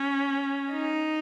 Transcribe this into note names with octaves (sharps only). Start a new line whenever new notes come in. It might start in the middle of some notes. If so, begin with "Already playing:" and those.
Already playing: C#4
D#4